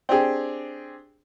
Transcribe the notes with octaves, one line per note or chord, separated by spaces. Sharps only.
C4 D4 G4 G#4